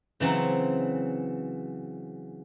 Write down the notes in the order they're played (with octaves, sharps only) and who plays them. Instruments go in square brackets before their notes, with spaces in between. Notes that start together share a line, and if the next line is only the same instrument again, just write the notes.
[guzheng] C#3 E3 F#3 C4